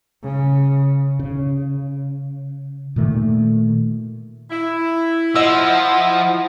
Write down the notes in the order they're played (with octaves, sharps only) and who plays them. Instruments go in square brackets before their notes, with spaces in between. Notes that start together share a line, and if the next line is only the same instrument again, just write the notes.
[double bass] C#3
[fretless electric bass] C#3
A#2 D#3 A3
[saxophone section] E4
[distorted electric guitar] F3 [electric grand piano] D#5 E6 [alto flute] F#5